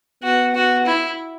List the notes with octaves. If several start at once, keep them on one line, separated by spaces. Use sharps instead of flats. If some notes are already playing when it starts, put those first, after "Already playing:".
B3 F#4
F#4
E4